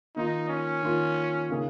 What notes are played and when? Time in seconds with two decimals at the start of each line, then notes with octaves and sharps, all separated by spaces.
0.16 D#3 A#3 D#4 F4
0.49 C#4
0.82 D#3 A#3 F4
1.50 C#3 A#3 D#4 G#4